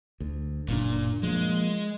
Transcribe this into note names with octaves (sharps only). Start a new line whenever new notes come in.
D2
F#1 A#2 D4
F3 G#3 A#3